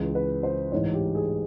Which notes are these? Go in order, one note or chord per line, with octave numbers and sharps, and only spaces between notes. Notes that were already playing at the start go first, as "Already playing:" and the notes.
Already playing: C#2 C#3 E3
B4
C5
A1 G#2 E3 C#5
G4
G#4